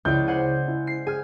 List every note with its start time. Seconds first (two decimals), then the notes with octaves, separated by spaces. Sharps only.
0.05 C#2 E4 D5 G6
0.28 C5 F#5 G#5
0.68 E4
0.87 C7
1.07 G#4 G#5 F6